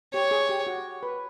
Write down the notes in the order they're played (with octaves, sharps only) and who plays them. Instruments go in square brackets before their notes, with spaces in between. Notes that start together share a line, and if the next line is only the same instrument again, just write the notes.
[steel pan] G4 [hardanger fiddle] C#5
[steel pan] G#4
G4
F#4
B4